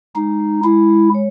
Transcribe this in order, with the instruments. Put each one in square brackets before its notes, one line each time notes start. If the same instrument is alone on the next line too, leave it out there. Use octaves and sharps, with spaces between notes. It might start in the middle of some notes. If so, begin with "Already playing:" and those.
[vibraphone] G#3 [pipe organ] D#4
[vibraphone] G#3
[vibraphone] G#3 [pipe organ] E4
[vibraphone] G#3
C#5